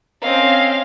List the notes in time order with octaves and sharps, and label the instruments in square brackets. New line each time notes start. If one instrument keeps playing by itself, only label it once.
[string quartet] C4 C#4 D#5 [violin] F5